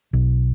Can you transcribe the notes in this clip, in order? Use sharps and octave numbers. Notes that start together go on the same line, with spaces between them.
B1